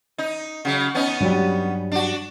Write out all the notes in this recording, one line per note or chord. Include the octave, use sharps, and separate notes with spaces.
D#4
C#3 F#3
B3 C#4 D#4
G2 F#3 G3
D4 F#4